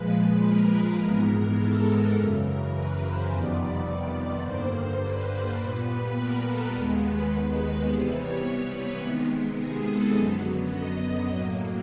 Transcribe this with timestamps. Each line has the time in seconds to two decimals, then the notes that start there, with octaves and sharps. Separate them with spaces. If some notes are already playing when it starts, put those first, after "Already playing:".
Already playing: A#2 F3 G#3 B4
0.43 A#4
1.00 G#2 E3 G#3 B3 A#4
1.57 A4
2.14 F#2 C#3 E3 A#4
2.43 A#4
2.72 B4
3.00 C5
3.28 F2 C3 D#3 G3 B3 D5
4.14 D5
4.42 G2 D3 G3 A#3 C5
5.00 B4
5.57 A#2 G3 B3 B4
6.14 A#4
6.42 A4
6.71 D#2 D#3 G#3 B3
7.00 B4
7.85 C3 E3 G3 B3 C5
8.13 C#5
8.71 B4
8.99 C3 D#3 G#3 B3
9.57 G#4
9.85 A4
10.13 F#2 D3 F#3 B3
10.70 D#5
11.00 D#5
11.27 A2 F#3 A#3